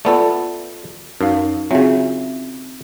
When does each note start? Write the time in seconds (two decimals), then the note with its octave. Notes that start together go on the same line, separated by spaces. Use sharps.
0.05 A3 B3 F4 A4 D5
1.21 F#2 D#4 F5
1.71 C#3 F#3 C4 F4 E5